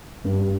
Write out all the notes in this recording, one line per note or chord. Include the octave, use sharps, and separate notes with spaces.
G2